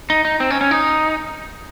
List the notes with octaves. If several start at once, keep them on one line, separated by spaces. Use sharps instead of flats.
D#4
D#4
C4
C#4
C#4
D#4